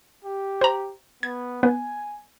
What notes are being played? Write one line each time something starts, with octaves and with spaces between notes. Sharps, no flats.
G4
C5 A#5
B3 G#6
B3 G#5